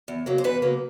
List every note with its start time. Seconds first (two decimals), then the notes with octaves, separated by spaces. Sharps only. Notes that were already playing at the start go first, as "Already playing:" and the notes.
0.08 E2
0.26 C#3 F#3 A#3
0.38 C5
0.44 E2 B4
0.62 C#3 F#3 A#3